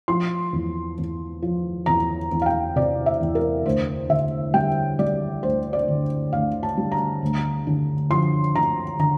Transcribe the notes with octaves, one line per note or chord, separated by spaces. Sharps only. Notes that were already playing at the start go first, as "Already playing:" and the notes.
F3 C6
E2
E2
F3
E2 A#5
E2
F5
G5
C3 D5
E5
E2
A#4
D2 C5
D3 E5
G3 G5
G3 D5
D2 C5
D5
D3
D2 F5
A5
G3
A#5
D2
D3
F3 C6
D3 A#5
D3 A#5